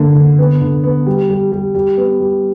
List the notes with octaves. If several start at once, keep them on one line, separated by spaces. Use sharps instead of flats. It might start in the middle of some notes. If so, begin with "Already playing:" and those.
Already playing: D3 A#3
D3
B3
D3
B3
G3
G3
G3
G3
B3
G3